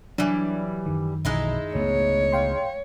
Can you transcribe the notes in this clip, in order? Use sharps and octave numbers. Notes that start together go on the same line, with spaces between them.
E3 F#3 G3 D4
F#2 D#3
B1 E3 G#3 D#4 E4
C#2 A3 B3 C#5
F5 G5 C6